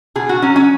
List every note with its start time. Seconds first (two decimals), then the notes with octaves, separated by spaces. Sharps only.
0.15 B2 G#4
0.29 F#4
0.42 F#3 C#4
0.56 C#4